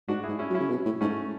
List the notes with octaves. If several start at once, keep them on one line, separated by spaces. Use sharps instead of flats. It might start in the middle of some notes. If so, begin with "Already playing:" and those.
G#2 D4 F#4
G#2 E4 G#4
C#4 E4
F#3
C#4 E4
C#3
B2
A2
G#2 A3 C#4